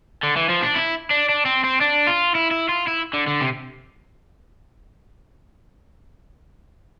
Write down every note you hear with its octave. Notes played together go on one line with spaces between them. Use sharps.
D3
E3
F3
D4
E4
D4
D4
C4
C4
D4
F4
E4
E4
F4
E4
D3
D3
C3